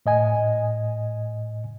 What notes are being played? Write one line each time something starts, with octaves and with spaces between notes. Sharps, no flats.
A2 D#5 G#5